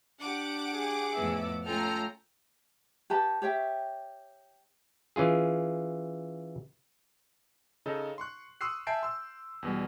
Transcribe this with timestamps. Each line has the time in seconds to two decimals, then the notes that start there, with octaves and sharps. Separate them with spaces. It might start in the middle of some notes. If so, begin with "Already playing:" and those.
0.20 D4 G4 F#5 D6
0.74 G#4
1.13 F2 A2 B3 E5
1.66 A3 C#4 F4 A4 G5 A#5 F6
3.10 G4 B4 A5
3.42 G4 C#5 E5 G5
5.16 E3 C#4 F4 G#4
7.86 C#3 D#4 A4 D#5
8.18 C6 C#6 F#6
8.61 C6 C#6 D#6 E6 F#6 C7
8.87 E5 G#5 A5 G6 C7 D7
9.03 C6 E6
9.63 E2 B2 G3